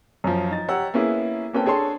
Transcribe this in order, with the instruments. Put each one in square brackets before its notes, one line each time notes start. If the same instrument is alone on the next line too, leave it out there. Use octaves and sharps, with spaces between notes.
[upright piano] F#2 F3
D#4 A6
G4 C#5 F#5 A#5 E6
A#3 B3 C#4 E4 G#4
A#3 C4 C#4 A4 B4 G5
D4 G#4 A4 C#5 C6